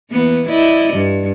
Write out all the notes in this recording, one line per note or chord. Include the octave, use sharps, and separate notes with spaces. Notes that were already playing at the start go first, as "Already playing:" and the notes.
E3 A#3 B3
E4 D5 D#5
G2